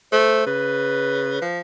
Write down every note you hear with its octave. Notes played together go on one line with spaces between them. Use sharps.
A3 C5
C#3 B4
F3